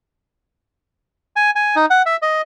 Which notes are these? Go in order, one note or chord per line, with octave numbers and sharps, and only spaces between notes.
G#5
G#5
D#4
F#5
E5
D#5